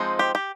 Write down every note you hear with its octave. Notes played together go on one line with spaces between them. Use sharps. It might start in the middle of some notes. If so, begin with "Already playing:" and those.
Already playing: F3 G#3 C4 D#4
G4
G4